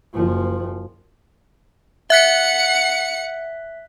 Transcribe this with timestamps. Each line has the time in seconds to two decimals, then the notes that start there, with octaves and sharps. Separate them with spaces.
0.15 F#1 F3
2.10 E5 F#5 F#6 B6 C#7